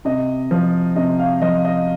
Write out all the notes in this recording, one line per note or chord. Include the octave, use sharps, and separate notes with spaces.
C3 D#5
F3
C3 D#5
F5
F3 D#5
D#5